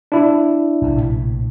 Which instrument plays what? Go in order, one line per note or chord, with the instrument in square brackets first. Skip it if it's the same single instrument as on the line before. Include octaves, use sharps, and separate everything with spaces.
[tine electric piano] D4 E4
[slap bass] A#1 A2 C3